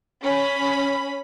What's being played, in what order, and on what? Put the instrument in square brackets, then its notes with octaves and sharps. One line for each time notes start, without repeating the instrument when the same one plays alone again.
[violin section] C#4 B5